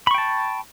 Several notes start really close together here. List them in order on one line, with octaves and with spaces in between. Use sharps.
B5 C#6 G5 A5